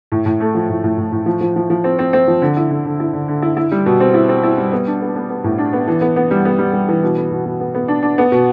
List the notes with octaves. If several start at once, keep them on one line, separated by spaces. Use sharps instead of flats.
A2
A2
A3
F3
A2
A2
A2
A2
F3
F3
F3
F3
C4
C4
C4
F3
D3
E4
D3
D3
E4
D3
D3
E4
E4
G3
B2
C4
E4
C4
E4
G3
B3
D4
B3
B3
B3
A2
D4
B3
E3
B3
B3
G3
B3
G3
G3
E3
B2
B3
B2
B2
B3
B3
D4
D4
B3
B2